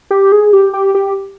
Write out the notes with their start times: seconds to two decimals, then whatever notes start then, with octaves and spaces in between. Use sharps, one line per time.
0.11 G4
0.32 G#4
0.53 G4
0.73 G4
0.95 G4